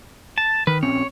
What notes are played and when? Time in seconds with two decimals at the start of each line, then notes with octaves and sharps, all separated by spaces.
0.38 A5
0.67 D#3 B4
0.83 A#1 C4 C#4 C#5